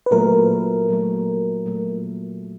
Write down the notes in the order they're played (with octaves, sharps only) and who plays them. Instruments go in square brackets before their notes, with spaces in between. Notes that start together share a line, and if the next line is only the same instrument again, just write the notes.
[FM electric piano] B4
[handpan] A#2 F#3 A3 [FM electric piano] A#4
[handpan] A#2 F#3 A3
A#2 F#3 A3